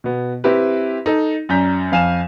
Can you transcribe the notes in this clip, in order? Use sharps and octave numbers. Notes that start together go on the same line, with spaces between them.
B2 B3
C4 E4 G4 B4
D#4 A4
F#2 D5 G#5 A#5 G6 B6
F2 F5 G#5 E7